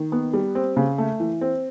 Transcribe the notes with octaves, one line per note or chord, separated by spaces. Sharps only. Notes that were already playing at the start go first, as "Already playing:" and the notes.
Already playing: D#3
B3
G3
C4
C#3
A3
E3
C4